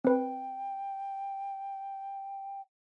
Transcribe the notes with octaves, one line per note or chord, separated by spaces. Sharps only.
C4 B4 G5